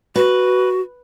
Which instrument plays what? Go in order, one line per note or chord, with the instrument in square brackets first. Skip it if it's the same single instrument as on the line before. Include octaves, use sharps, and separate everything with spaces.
[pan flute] F#4 [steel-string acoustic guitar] B4